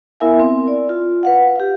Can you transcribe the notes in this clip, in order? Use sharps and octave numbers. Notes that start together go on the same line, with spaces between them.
B3 E4 A#4 E5 F5 G#5
C4
D5
F4
B4 F5 F#5
G4 F5